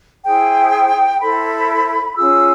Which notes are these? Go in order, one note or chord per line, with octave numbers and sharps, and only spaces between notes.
E4 G#4 C5 G5
E4 A4 C5 B5
C#4 F4 G#4 E6